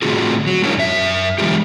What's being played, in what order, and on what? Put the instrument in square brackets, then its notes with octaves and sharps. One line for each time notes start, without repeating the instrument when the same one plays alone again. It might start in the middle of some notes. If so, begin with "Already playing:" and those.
[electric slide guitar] A2 D3 C4 F4 F#4 G#4
F#3
G#3 C#4 D4 E4 A#4 C#5
F#2 E5
D3 E3 G#3 C#4 F4 G4